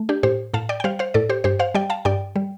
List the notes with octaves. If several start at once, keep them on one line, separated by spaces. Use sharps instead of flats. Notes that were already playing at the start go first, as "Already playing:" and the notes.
Already playing: A3
D4 G4
A2 G4 C5
A2 F5 A5
D5 G5
G5
G3 C5 F5
C5 F5
A2 A4 D5
G4 C5
G2 G4 C5
C5 F5
G3 D5 G5
F5 A5
G2 D5 G5
G3